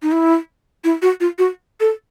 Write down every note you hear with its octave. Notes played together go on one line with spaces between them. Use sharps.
D#4
E4
E4
F#4
F4
F#4
A4